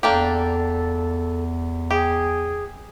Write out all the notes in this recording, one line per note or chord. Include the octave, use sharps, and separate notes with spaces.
E2 A#3 D4 G4 A4
G4 G#4